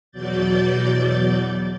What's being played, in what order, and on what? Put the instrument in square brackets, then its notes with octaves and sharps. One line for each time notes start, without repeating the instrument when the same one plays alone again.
[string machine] E2 B2 F#3 D5 G6 A6